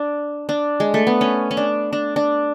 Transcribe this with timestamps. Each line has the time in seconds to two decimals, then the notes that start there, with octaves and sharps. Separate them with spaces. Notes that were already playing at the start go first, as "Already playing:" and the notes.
Already playing: D4
0.49 D4
0.80 G#3
0.94 A3
1.07 B3
1.21 C#4
1.51 C#4
1.57 D4
1.93 D4
2.16 D4